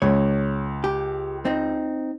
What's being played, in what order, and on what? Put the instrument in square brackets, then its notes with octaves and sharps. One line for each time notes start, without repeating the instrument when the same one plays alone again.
[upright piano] C#2 [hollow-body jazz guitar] C#5
[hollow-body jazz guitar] G4
C4 D#4